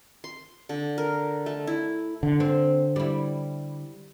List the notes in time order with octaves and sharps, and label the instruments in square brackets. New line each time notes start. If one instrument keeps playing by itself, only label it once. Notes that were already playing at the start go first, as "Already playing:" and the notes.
[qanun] C6
D3
A#4
A3
E4
[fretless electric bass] D3
[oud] C4
G3 E4